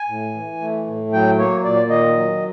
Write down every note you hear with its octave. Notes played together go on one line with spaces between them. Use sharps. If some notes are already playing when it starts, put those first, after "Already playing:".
Already playing: G#5
A2
E3
A3
A2
F#3 G5
A#3 C#5
A#2 D5
D#3 D#5
F#3